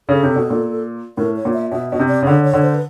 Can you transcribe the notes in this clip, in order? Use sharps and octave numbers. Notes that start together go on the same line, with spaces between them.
C#3 A4
C3
B2
A#2
A2 A#4
C#5
A#2
E5
B2 E5
B2 D#5
C3
D5
C#3
D3 C#5
C#5
D3
C5
B4